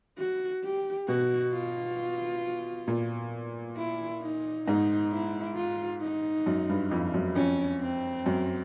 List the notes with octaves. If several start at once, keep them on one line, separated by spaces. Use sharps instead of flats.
F#4
G4
B2 F#4
F4
A#2
E4
D#4
G#2 D#4
E4
F4
D#4
F#2
G2
F2
F#2
F2 C#4
C4
F#2